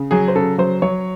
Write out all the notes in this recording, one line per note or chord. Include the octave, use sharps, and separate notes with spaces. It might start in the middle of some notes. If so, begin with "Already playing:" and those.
Already playing: C#3
F#3 G#4
C5
C#3 A4
F#3 C5
F#3 C#5